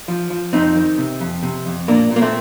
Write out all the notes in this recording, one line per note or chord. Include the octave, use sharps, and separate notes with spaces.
F3
F3
F2 C4 D#4
D#3
C3
F2
C3
F2
A#2 A#3 D4
A#2
A#3
A3 C4